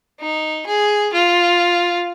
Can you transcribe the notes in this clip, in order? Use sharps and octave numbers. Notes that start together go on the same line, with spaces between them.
D#4
G#4
F4